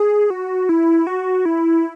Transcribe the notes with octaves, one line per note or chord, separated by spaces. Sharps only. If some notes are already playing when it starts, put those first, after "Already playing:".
Already playing: G#4
F#4
E4
F#4
E4